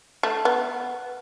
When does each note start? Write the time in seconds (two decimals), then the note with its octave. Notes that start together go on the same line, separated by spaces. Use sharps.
0.23 A3
0.45 B3